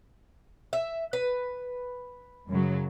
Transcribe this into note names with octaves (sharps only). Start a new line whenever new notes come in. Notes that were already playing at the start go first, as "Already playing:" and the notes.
E5
B4
F#2 C#3 F#3